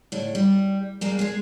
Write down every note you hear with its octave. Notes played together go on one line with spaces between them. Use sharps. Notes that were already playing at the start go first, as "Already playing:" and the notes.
A2 D3
G3
G3 G#3 A#3
G#3 G#4